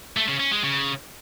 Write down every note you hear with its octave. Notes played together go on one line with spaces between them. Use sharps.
A3
C#3
C#4
G#3
C#3